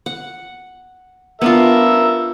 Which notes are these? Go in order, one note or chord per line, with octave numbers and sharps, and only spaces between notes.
F#5
B3 D4 F4 A#4 E5 E6